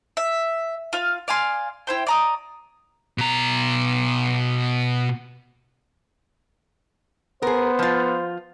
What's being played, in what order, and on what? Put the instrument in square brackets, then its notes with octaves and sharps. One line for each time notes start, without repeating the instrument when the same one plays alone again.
[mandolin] E5
F4 F5
D5 F5 G#5 C6
E4 C5 G5
D5 A#5 D#6
[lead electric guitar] B2 A#5
[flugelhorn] B3 [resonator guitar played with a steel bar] G#4 A#4 [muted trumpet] C5
[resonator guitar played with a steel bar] F3 F4